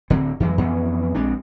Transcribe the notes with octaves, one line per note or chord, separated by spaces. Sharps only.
D1 D3 C4
F2 E3 F#3 G#3
F2 E3 B3 C#4
A#1 G#3 C4 D4